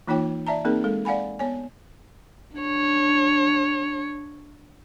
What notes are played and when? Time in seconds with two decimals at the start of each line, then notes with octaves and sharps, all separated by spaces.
0.08 E3 A#3 D#4 F4 C#5 G5
0.47 D5 E5 A5 A#5
0.65 A#3 C4 D#4 G#4 A#4
0.84 G#3 A4
1.05 D5 F5 F#5 G#5 B5
1.39 B3 C#5 G#5
2.58 D4 C#5